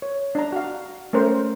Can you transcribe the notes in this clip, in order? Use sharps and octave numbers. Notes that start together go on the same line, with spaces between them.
C#5
D4 A#5
F#4 F5
A3 C#4 A#4 C5